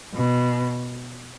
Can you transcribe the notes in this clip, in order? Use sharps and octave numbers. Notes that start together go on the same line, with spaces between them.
B2